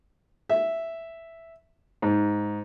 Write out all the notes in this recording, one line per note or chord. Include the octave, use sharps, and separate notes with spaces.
E5
G#2